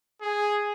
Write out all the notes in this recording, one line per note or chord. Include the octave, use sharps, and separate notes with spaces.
G#4